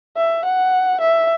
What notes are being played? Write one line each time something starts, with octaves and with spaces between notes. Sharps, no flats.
E5
F#5
E5